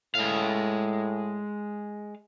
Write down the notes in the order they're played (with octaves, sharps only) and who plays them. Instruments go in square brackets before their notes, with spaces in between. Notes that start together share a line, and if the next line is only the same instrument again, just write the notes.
[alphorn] A2 [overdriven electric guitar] G#3 F5